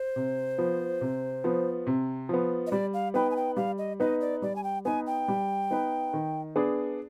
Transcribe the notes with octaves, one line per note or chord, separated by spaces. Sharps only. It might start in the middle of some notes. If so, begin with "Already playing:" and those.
Already playing: C5
C3
F3 B3
C3
F3 B3
C3
F3 B3
D#5
G3 D5
F5
B3 D#4 B4 G5
G#5
G5
G3 F5
D#5
B3 D#4 B4 D#5
D5
G3 D5
G#5
G5
B3 D#4 B4 G#5
G5
G3
B3 D#4 B4
D#3
B3 D4 G#4